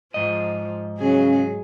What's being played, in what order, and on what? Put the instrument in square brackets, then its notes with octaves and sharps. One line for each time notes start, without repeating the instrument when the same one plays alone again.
[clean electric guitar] G#2 D#5 [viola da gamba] F3
[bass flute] C#3 [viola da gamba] F#3 G#4